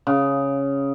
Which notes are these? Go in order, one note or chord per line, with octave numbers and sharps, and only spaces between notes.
C#3